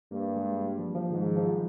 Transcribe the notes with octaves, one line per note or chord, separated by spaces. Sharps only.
G2 A#3
G#3
G3
F3
F3
G#2 D#3
F3
F3
G3